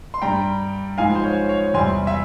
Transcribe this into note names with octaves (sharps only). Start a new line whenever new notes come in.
C6
G2 G3 G5 A#5
G#2 F3 G#3 F5 G#5
C5
C#5
C#5
E2 C3 G3 G#5 C6
E5